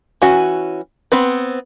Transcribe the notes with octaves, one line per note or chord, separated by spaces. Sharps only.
E3 C#4 F#4
B3 C4 B4